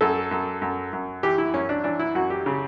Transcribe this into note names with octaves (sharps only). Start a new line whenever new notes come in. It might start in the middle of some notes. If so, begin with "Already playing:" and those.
F#2 A4
F#2
F#2
F#2
E3 G4
E4
F#2 C#4
D4
E3 D4
E4
F#2 F#4
G4
C#3